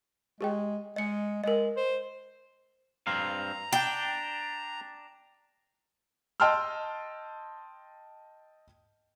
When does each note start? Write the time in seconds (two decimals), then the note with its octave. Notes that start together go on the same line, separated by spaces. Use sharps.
0.41 G#3 G4 G#4 G5
0.96 G#3 D#5 C#7
1.44 G#3 A#4 D#5
1.76 C5
3.07 G2 C4 F5 A#5
3.73 D4 G5
6.40 D#5 G5 A5 C6 E6 F6